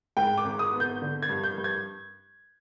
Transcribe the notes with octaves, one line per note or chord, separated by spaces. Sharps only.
G#2 G5
D6
G#1
D#6
B3
G6
D3
G#6
G2
G6
G2
G#6